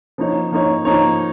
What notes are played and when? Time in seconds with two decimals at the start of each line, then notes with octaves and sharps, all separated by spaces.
0.18 F3 A#3 D#4 C#5
0.52 F3 A#3 D#4 C#5
0.85 F3 A#3 D#4 C#5